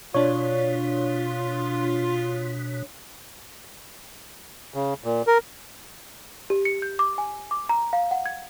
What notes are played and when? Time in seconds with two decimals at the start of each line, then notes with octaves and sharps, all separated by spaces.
0.14 B2 D4 F4 C#5
4.74 C#3
5.04 A#2
5.27 A#4
6.50 G4
6.65 C#7
6.82 G6
6.99 D6
7.18 G#5
7.51 D6
7.69 A#5
7.93 F5
8.11 F#5
8.26 G#6